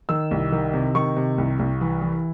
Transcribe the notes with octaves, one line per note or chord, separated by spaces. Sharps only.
D#3 E6
C2
D#3
C3
D#3 C#6
C3
C2
C2
E3
E3